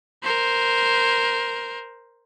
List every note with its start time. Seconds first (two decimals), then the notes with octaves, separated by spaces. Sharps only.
0.23 A#4 C5